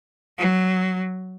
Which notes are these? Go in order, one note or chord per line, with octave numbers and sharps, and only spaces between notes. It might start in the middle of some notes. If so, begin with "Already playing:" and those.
F#3